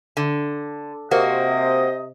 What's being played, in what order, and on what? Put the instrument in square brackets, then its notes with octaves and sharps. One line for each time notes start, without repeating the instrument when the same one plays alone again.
[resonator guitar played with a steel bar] D3
[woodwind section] C3 C5 D#5 [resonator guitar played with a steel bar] A#3 F#4